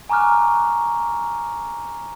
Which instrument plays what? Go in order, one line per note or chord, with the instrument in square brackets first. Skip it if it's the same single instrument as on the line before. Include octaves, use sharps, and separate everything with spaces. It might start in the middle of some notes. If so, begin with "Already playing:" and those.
[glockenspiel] G#5 A#5 C#6 D6 F6 F#6